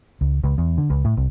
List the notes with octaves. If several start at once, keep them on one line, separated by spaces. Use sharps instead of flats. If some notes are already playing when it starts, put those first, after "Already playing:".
C#2
C#2
E2
D3
C#2
A2
C2